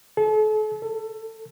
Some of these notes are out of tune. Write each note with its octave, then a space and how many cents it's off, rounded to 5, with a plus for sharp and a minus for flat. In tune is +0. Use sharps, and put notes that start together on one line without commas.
A4 -40
A4 +20